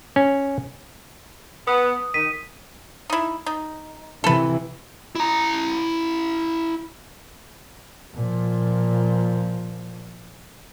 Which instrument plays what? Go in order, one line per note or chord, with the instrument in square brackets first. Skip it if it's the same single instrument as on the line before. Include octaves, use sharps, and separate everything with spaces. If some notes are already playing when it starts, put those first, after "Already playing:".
[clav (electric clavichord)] C#4
[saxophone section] B3 [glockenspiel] D#6
[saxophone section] D#3 [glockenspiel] B6 D#7
[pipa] D#4 E4
D#4
[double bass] C3 E3 [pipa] A4 B4
[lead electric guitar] E4 A#5
[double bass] A#2 F3